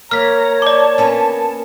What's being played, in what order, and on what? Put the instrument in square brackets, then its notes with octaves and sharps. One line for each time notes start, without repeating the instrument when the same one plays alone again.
[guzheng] A#3 [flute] C#5 [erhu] A#5 [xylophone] F6 B6
[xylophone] D5 D6 [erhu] A5
[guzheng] A#3 B3 C#4